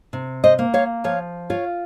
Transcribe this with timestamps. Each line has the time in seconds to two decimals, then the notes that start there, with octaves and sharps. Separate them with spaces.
0.13 C3
0.44 C5 D#5
0.59 A#3
0.74 C#5 F5
1.04 F3 C#5 F5
1.50 F4 C#5 F5